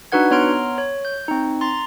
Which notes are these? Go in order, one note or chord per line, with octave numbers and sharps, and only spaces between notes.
D4 D#4 F#4 B4 F#5 G#6
B3 C#5 A#5 C6 F6 D7
C#5
G6
C4 D#4
A#5 C6 A6